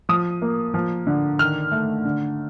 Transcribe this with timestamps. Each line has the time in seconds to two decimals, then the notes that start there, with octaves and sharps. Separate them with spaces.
0.09 F3 D#6
0.42 A#3
0.74 F3
1.07 D3
1.39 D#3 F6
1.72 A3
2.05 D3